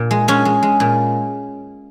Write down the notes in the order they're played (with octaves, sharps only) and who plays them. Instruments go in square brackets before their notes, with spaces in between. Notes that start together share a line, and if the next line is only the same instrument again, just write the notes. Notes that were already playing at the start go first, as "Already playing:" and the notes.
Already playing: [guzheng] A#2
G#3
G#3 C#4
G#3
G#3
A#2